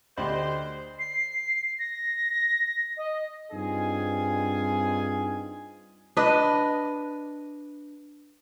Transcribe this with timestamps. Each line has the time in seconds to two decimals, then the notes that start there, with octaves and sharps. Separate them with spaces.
0.18 D2 G4 C5 D#5 B5 C6
0.99 C7
1.79 A#6
2.97 D#5
3.52 G2 C4 D#4 F4 G#4 G#5
6.17 D4 B4 D#5